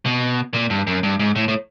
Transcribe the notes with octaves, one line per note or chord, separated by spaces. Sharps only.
B2
A#2
G2
F#2
G2
G#2
A2
A2